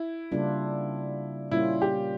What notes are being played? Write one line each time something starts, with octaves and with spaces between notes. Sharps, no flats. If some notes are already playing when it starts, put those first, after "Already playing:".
Already playing: E4
C#3 G3 A#3 D4 F4
A#2 G3 A#3 C#4 E4 F4
G4